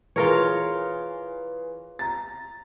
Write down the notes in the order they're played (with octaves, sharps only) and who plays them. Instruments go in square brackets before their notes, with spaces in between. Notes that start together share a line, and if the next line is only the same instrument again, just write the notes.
[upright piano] E3 G#4 [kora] F4 A#4 C#5
[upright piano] A#5 A6